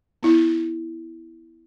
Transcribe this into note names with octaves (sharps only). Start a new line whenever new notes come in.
B3 E4